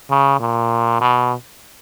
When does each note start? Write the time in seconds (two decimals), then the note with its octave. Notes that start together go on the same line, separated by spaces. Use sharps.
0.10 C#3
0.40 A#2
1.01 B2